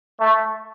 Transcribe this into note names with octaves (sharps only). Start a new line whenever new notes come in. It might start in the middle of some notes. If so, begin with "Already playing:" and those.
A3